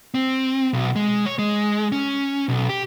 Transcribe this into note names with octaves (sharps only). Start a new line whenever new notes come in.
C4
B1
G#3
C#5
G#3
C#4
B1
G4